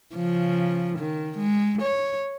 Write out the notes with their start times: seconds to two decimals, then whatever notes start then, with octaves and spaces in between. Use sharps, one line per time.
0.15 C#3 F3
0.99 D#3
1.38 G#3
1.82 C#5